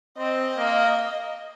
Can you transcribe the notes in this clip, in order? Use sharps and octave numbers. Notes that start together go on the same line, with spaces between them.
C4 D#5
A#3